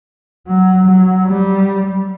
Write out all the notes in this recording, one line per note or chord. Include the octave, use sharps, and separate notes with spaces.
F#3
F#3
G3